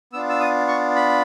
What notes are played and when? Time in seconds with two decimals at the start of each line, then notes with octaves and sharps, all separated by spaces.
0.13 B3 D4 F4 E6
0.29 E6
0.40 D#6
0.68 C#6
0.96 B5